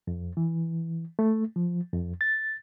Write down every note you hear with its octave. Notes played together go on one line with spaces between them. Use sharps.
F2
E3
A3
F3
F2
A6